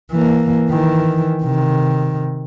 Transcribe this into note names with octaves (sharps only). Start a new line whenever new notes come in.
E3 A#3
D#3 E3
C3 D#3